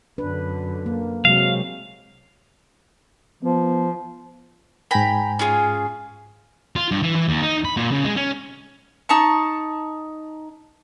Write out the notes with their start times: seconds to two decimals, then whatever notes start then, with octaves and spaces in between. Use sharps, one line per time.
0.18 F#2 D3 D4 B4
0.86 A#3
1.25 C3 F#3 G#3 F5
3.43 F3 B3
4.91 G#2 G5 G#5 A#5 B5
5.39 C#4 F4 G#4
6.76 F4
6.91 G2
7.03 E3
7.16 E3
7.27 D#2
7.42 D#4
7.65 B5
7.77 A#2
7.92 C#3
8.04 G#3
8.16 C#4
9.09 D#4 A5 C#6